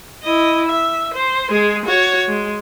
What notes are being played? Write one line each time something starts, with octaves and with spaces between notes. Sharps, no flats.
E4 D#5
E5
C5
G#3 G#4
F#4 C#5
G#3